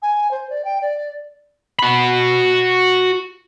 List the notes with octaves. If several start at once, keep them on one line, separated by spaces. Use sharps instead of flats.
G#5
C5
D5
G5
D5
F#4 B5